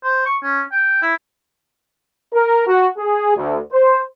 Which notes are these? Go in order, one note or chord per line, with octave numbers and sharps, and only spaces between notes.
C5
C#6
C#4
G5
E4
A#4
F#4
G#4
D2
C5